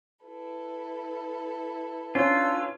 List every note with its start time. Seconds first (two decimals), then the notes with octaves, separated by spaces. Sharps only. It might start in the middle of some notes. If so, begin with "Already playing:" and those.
0.24 E4 A4 B4
2.15 C#4 D4 F4 C#5 E6